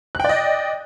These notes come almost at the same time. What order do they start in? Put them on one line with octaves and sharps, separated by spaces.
F#6 G5 D5 D#5